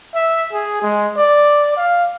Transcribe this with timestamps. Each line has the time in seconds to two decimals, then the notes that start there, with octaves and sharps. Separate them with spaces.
0.15 E5
0.53 G#4
0.82 G#3
1.17 D5
1.77 F5